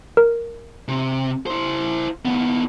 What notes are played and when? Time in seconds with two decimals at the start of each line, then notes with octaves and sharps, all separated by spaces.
0.17 A#4
0.88 C3
1.46 E4 C5
2.25 D#2 B3